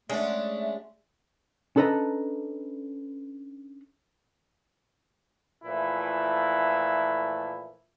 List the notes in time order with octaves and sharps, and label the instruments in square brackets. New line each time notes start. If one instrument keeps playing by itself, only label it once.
[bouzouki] G#3 F#5 [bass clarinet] A3 [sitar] C#4 D4 [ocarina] E5
[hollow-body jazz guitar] C#4 D4 A4 B4 D#5 A#5
[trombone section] A#2 E3 F3 A3 E4